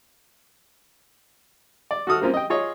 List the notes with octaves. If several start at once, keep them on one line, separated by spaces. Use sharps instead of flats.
D5
F#4 A4 D#6 F6
A#3 C4 C#4 F4
D#5 G5
F4 G#4 C#5 D#5